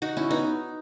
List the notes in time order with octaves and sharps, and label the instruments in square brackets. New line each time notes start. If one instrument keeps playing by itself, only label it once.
[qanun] D#4 F#4
C#4 E4
B3 D#4